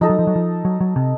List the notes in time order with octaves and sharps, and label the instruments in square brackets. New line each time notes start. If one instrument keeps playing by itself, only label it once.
[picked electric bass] F3 [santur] D#4 A4 D#5
[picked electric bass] F#3
F3
F#3
F3
F#3
F#3
C3